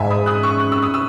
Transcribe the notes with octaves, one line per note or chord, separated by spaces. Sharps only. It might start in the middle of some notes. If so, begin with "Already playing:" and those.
Already playing: G#2 E5 G#5
B5 D#6
D#6 F#6
C#6 E6
F#6
E6
D#6
E6